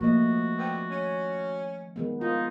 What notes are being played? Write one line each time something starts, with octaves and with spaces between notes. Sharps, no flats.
D#3 F3 A3 A#3 F#4 D#5
D3 B3 C4
C#4
D#3 G#3 B3
D#4 F4